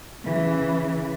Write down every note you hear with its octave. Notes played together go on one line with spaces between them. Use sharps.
C#3 E3